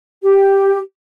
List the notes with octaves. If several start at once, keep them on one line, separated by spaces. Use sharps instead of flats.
G4